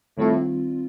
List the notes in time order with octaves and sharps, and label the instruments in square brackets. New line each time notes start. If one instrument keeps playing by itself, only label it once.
[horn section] A2 [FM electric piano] D#3 G3 C4 F4